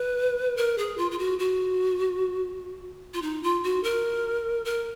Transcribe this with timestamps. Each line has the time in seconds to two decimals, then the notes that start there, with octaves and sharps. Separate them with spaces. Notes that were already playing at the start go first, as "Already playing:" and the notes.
Already playing: B4
0.57 A#4
0.78 G#4
0.97 F4
1.11 F4
1.19 F#4
1.39 F#4
3.14 F4
3.22 D#4
3.43 F4
3.64 F#4
3.83 A#4
4.65 A#4